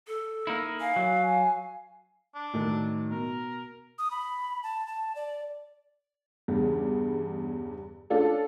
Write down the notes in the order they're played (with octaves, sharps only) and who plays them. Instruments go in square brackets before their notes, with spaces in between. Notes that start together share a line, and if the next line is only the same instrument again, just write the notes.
[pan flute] A4
[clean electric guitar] A#3 D#4 E4
[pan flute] F5 [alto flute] G#5
[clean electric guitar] F#3
[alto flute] G#5
[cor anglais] D4
[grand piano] A2 D#3 F#3
[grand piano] B2 [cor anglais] A#4
[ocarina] D#6
B5
A5
A5
D5
[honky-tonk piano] E2 G2 C#3
C#4 D4 F4 A4 D5